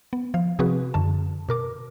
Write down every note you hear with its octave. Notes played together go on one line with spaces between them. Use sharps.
B3
F3 F5
C3 F3 C4 F#4 G#4 B4
F#2 D3 A5
B2 A#4 D6